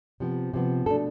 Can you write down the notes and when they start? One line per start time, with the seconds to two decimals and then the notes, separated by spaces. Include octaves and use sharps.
0.20 C3 F3 B3
0.53 C3 F3 B3
0.86 B2 A3 D4 A4